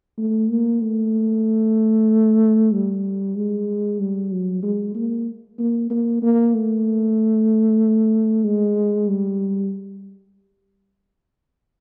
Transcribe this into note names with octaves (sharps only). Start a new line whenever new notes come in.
A3
A#3
A3
G3
G#3
G3
F#3
G#3
A#3
A#3
A#3
A#3
A3
G#3
G3